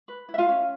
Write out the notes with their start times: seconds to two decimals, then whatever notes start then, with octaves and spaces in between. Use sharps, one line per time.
0.08 B4
0.29 E4
0.34 E5
0.38 F4 F5
0.49 C#4